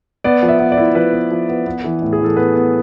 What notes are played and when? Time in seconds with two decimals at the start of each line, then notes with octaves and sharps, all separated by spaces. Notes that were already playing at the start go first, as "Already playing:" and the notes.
0.24 B3 D5
0.43 F3
0.48 E5
0.59 B3
0.72 D5
0.78 E4
0.95 F3 B4
1.13 B3
1.31 F3
1.49 B3
1.67 B3
1.84 E3
2.02 A2
2.13 G#4
2.20 E3 A4
2.36 B3 B4
2.55 B3